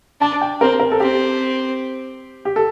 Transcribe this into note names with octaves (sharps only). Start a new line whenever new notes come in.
D4 A5
G5
C4 A#4
A#4
A4
C4 G4
G4
A4